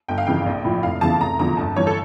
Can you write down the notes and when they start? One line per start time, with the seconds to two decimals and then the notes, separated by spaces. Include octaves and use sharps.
0.08 G1 G5
0.18 F5
0.27 F2 C#3 E3 G5
0.46 A#1
0.65 A2 F3
0.83 F1 F5
1.01 E2 C#3 E3 A5
1.20 F1 A#5
1.39 E2 D3 F3 A#5
1.57 G1 A5
1.76 G2 E3 C#5
1.87 A4